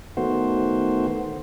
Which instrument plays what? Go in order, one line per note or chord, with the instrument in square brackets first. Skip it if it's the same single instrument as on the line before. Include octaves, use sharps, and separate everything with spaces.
[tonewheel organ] D#3 A3 B3 F#4 C5